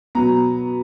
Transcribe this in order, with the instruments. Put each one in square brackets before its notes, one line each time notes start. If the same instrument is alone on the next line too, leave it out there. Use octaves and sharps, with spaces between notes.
[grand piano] B2 F#3 B3 A#5